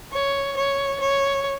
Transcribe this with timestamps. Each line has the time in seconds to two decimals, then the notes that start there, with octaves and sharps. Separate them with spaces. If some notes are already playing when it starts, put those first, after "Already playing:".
0.12 C#5
0.57 C#5
1.01 C#5